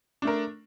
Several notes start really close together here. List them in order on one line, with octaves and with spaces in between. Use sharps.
D4 A3 A#4